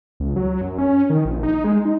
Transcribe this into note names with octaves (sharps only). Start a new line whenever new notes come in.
C#2
F#3
F#2
C#4
D#3
A#1
D#4
G#3
D#4